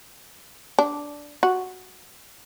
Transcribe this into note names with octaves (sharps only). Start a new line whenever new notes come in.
D4
F#4